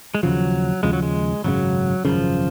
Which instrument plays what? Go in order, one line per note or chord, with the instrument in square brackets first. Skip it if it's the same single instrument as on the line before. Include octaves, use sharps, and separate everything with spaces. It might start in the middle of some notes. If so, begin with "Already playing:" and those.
[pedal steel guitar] G#3
[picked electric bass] D#2 C#3 F3 [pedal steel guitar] F#3
[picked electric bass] D#2 C#3 F3 [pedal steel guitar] G#3
[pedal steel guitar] F#3
G#3
[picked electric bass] G#1 F#2 C#3 [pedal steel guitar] F#3
[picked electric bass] G#1 F#2 C#3 [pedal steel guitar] F3